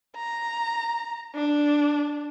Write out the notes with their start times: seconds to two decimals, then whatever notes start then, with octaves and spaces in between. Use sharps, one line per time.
0.16 A#5
1.35 D4